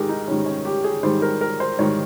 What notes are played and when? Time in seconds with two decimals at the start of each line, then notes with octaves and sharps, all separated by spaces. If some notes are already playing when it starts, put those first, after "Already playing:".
Already playing: G#2 D#3 G4 G#4 A#4
0.09 D#4
0.28 G#2 D#3 G3 C#4
0.46 C#4
0.65 G4
0.84 G#4
1.03 G#2 D#3 G3 C5
1.22 A#4
1.41 A#4
1.60 C5
1.79 G#2 D#3 G3 C#5